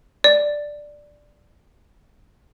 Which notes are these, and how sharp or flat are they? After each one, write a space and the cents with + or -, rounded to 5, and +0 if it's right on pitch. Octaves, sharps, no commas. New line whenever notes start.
D5 +5